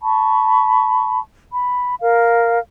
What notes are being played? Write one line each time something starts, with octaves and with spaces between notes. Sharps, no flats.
A5 B5 C#6
B5
A#4 F5